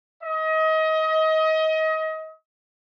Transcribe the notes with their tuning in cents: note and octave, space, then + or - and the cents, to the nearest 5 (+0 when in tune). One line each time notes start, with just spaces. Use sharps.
D#5 +30